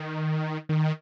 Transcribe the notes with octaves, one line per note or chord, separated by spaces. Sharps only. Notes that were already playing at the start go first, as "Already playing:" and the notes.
Already playing: D#3
D#3